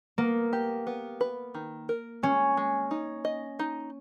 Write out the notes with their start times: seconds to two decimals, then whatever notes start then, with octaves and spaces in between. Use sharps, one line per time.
0.18 A#3 B3
0.53 G4
0.87 B3
1.21 B4
1.55 D#3
1.89 A#4
2.23 G#3 C#4
2.57 G#3
2.91 D#4
3.25 D#5
3.59 D#4